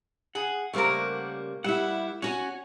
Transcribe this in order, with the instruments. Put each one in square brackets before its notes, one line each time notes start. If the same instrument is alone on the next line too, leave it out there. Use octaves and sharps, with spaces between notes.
[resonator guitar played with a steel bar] G#4 [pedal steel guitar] F#5
[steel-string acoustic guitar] C#3 G3 C5 [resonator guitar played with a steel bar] A3 A#3 A#4
[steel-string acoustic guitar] G3 E4 [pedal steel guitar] E5 F#5
[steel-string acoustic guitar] C#4 F#4 G#5 [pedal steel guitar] C#5 F#5